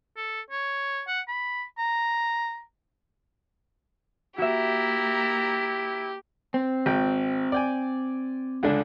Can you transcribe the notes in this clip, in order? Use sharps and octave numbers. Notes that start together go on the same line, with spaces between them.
A4
C#5
F#5
B5
A#5
A#3 E4 F#4 G4 E5 A#5
C4
G#1 G5
D5 G5 G#5
C#2 D3 D4